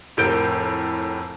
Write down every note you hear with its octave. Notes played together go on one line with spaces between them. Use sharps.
F1 A2 A#4 G6 D7